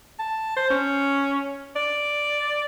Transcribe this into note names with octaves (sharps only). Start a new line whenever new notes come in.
A5
C5
C#4
D5